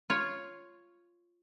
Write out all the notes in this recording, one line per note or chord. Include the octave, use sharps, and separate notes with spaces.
F4 C#5